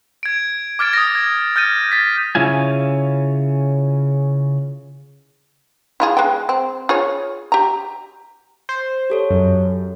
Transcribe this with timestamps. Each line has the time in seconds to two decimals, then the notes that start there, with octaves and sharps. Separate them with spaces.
0.23 G#6 D7
0.79 D6 F6 G#6 A6 D7
0.93 D#6 A#6
1.15 G#6
1.56 F6 G6 A6 D#7
1.91 A6 B6
2.35 C#3 C#4 E4 F4 G#5
6.00 E4 F4 G#4
6.17 G#3 B3 G5
6.49 C4
6.89 F4 G#4 C#5
7.52 G4 A#5
8.69 C5
9.10 G4 A4 C#5
9.30 F#2